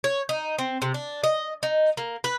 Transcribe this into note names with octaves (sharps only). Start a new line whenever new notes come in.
C#5
D#4
C4
C3
D4
D#5
D#4
A#3
B4